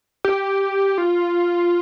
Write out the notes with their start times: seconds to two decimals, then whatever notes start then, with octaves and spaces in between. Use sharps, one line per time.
0.25 G4
0.98 F4